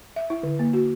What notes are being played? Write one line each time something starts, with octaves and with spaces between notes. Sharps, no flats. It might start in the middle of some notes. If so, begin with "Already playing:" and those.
E5
E4
D3
A#3
F#4